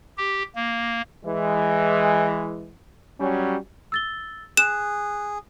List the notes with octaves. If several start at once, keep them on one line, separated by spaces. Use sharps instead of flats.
G4
A#3
E3 G#3
F#3 G3 C#4
E6 A6 G7
G#4 F#6 E7